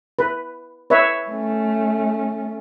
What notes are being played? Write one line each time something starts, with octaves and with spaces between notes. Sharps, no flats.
B4
B4 C#5 E5
A3 C#4